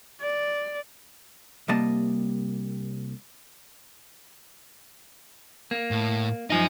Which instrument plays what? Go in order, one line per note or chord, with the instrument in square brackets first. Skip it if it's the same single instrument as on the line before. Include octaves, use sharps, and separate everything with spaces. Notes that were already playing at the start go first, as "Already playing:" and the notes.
[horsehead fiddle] D5
[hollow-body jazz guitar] C2 C3 G3 A#3 D#5 A5
[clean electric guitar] A#3
[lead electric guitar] A2
[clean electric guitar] F#2 F3 D#4 [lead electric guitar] D#5 G#5